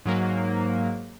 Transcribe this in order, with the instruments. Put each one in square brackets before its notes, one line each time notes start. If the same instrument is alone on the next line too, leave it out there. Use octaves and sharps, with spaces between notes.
[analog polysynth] G#2 F#3 A#3